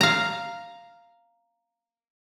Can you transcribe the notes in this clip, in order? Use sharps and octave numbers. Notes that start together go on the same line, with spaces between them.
F5 A#5